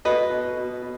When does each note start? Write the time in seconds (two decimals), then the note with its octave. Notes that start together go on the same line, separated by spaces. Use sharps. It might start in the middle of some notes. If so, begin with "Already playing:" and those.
0.05 F#3 B4 D#5
0.30 B2
0.57 B2
0.82 B2